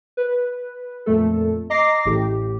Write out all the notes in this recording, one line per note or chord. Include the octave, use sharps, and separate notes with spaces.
B4
F2 A#2 A3 A4
D#5 A#5 D6 A#6 C7
A1 A2 G4